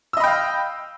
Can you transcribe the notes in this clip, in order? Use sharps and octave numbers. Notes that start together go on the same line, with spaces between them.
D#5 F5 G5 B5 E6